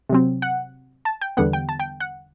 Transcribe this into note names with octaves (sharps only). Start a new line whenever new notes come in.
C3 F#3 C4
F#5
A5
G5
E2 D3 G3 B3 F#5
G5
A5
G5
F#5